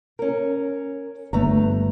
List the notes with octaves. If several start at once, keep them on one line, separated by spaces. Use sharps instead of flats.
C#4 A#4
G1 A3 B4 A#5